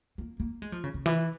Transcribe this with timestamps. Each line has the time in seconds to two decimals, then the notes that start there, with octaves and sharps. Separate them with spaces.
0.18 A#3
0.40 A#3
0.62 G#3
0.72 F3
0.84 C#3
0.94 C#3
1.06 E3